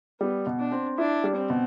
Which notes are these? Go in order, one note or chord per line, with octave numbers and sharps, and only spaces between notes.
G3 B3
B2
D4
C4
D4 E4
G3
C4
B2